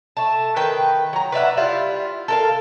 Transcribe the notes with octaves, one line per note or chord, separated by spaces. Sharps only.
A3 A5
D#3 B4 G5
F#3 A#5
B4 D5 E5 F#5
G3 E4 F4
A4 A#4 F5